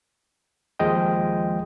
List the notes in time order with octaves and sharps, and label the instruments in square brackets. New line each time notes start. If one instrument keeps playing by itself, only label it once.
[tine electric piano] D#2 F3 G#3 D#5 G5